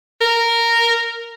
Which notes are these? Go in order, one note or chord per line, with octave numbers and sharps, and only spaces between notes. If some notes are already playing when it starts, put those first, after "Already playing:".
A#4